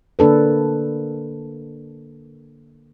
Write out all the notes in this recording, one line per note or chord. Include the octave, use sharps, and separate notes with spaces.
D3 A#3 D4 A4 B4